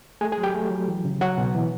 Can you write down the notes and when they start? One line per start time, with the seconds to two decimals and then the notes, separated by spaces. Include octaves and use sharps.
0.21 A3 G#4 G#5
0.32 G#4 G#5
0.38 F#3
0.43 G4 G5
0.54 A3
0.71 F#3
0.88 E3
1.05 C#3
1.21 F#3 F#4 F#5
1.38 B2
1.55 E3